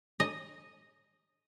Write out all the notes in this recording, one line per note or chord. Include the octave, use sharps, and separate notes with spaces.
D#5